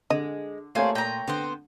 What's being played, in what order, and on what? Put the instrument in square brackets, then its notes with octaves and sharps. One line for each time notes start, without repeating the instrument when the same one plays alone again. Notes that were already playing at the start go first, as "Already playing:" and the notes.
[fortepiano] D3 [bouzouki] G#3 [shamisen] D#5
[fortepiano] A3 A#3 C#5 [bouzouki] D4 [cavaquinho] F4 C5 G#5
[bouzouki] A#2 [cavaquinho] G5 A#5
[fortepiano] D3 [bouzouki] B3 C4 C5